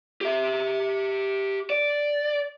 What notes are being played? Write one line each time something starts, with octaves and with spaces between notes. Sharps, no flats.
G4 E5
D5